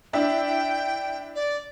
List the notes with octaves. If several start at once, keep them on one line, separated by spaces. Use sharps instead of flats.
D4 E4 E5 G5
D5